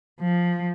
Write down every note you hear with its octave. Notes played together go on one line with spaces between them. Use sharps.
F3